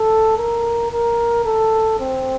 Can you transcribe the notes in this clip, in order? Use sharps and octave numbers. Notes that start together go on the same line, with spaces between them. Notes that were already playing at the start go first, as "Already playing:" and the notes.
Already playing: A4
A#4
A#4
A4
C4